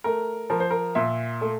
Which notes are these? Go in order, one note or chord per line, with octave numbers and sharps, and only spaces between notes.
A3 A#4
F3 A#4
C5
A#4
A#2 E5
A3